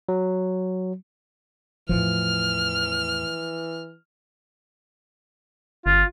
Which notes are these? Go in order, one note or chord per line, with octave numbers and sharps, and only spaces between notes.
F#3
E2 A2 E3 F3 F6
G1 F4